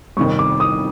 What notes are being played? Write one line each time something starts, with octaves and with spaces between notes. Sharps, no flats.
G1 F2 C3 D#3 C#6
D6
D#6